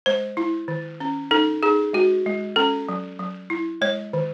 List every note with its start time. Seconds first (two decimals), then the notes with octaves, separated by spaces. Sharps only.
0.06 G#3 C5
0.37 E4
0.68 D#3
1.00 C#4
1.31 D#4 A4
1.63 D#4 G#4
1.93 G#3 F#4
2.26 G#3
2.56 C#4 A4
2.89 F#3
3.19 F#3
3.50 E4
3.81 G#3 C#5
4.13 D#3